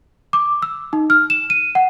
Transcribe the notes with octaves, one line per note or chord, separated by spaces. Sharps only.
D6
E6
D#4
F6
E7
D#7
F#5